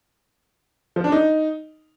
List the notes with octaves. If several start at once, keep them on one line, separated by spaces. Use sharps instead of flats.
F3
D4
D#4